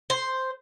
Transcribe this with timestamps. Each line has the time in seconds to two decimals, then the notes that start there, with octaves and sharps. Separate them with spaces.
0.10 C5